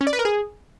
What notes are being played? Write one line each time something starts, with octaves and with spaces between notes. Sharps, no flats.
C#4
D5
B4
A#4
G#4